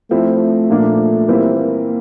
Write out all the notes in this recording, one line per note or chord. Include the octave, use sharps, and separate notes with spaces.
F3 A3 C4 E4
A#2 F3 A#3 D4
E3 G3 A#3 C4 E4
A#3